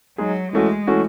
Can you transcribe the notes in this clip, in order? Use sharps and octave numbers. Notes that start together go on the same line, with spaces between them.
F#3 G#3 D#4 G#4
E3 G#3 A3 C#4 F#4
E3 A3 C#4 F#4